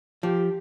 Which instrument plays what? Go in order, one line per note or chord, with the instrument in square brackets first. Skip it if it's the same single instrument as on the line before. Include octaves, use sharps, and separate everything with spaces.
[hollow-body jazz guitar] F3 [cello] G4